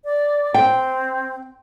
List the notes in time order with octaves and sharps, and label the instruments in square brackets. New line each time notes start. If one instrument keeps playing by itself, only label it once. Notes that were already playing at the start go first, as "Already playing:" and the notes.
[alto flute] D5
[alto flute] C4 [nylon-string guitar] G5